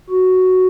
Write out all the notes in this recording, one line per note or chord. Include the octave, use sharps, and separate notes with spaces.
F#4